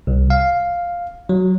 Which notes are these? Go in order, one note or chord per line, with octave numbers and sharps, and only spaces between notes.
C2
F5
F#3